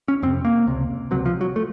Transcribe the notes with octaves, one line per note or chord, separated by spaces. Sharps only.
C#4
F2 C3 C4
A#3
C#2 C3
C#2 C3 F#3
F3
F#3
A3